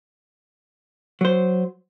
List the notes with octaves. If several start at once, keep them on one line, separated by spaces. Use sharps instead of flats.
F#3 C5